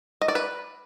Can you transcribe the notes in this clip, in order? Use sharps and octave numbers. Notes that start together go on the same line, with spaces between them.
D#5
D5
B4